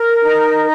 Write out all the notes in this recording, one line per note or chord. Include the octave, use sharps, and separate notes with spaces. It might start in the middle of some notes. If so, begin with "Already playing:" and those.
Already playing: A#4
D#4